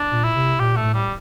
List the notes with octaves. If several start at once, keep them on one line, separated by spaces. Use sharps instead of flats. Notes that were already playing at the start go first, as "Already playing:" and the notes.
Already playing: D4
A#2
E4
C3
A#2 G4
A3
A2
G3